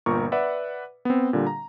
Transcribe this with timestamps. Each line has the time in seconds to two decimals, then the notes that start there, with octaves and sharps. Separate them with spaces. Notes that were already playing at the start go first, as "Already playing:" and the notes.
0.06 G1 A#2 A#4 C#6
0.32 B4 D5 E5 F#5
1.05 B3 C4
1.33 A#2 D3 G3
1.47 A#5